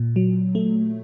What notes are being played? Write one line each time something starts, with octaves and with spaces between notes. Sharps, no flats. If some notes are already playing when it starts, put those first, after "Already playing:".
Already playing: A#2
F#3
A3